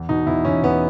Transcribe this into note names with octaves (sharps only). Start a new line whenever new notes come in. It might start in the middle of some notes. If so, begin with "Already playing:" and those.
Already playing: E2
B2 D#4
E2 E4
E2 C#4
E2 B3